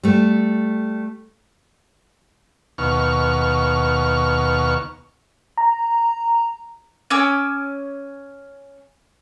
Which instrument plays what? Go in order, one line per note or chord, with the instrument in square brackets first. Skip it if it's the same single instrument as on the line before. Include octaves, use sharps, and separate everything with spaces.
[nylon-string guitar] G3 A3
[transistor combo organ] D#2 B2 C#6 F6
[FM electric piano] A#5
[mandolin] C#4 G#5 D6 E6